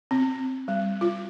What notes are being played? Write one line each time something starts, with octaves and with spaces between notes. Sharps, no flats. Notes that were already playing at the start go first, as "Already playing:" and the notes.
C4
G3
F4